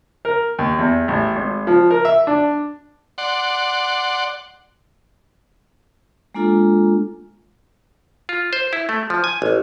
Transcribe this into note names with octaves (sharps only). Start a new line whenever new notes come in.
A#4
D#2
E2
A1
G#1
F3
A#4
E5
D4
D5 F#5 C6
G#3 A#3 D4 F4 A4
F4
C5
E4
A3
F3
G#5
A1